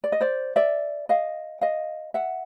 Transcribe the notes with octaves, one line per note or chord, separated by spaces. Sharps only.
D5
D#5
C5 D5
D5 E5
D#5 F5
D#5 F5
E5 F#5